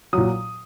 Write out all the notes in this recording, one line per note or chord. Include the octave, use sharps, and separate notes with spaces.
A#2 F#3 D#6